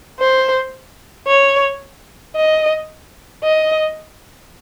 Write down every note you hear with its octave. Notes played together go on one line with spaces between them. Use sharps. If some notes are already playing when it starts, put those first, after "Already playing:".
C5
C#5
D#5
D#5